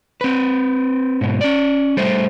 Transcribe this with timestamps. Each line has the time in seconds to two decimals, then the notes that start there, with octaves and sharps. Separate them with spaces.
0.21 C4 B4
1.21 G#2 B2
1.41 C#4 D5
1.97 G3 A3 C5